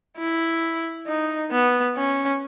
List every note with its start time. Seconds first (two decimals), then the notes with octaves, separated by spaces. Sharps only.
0.18 E4
1.07 D#4
1.51 B3
1.97 C#4